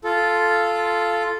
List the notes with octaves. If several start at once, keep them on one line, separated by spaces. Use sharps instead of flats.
F4 A4